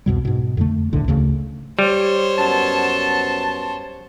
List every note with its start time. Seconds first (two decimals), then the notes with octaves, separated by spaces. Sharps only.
0.06 C2 F2 B2 G3
0.25 G#2 B2
0.57 F2 D3 A3
0.93 A#1 D#2 A2 D3
1.08 D2 C#3 A3
1.79 G3 C5 C#5
2.38 F#2 B3 A5